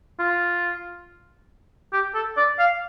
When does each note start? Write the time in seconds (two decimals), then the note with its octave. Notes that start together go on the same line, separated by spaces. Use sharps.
0.20 F4
1.93 G4
2.15 A4
2.37 D5
2.59 F5